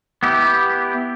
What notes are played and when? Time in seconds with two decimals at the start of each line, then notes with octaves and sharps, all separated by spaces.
0.23 B3 E4 G4